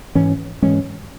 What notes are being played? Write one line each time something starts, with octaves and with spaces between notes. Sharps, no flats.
G#2 E3 G#3 C#4
G#2 E3 G#3 C#4